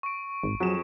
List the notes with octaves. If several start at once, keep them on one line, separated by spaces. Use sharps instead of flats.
C#6 D7
G#1
F2 F#3 G#4 E7